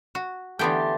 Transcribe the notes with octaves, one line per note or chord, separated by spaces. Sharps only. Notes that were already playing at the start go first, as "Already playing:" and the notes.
F#4
D3 E3 A3 B3 G4 G5 A5 C6